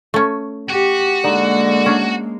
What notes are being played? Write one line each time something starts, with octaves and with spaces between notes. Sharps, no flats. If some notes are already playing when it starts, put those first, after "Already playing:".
A3 C#4
F#4 G4
D3 G#3 A#3 D#4
C#4 D4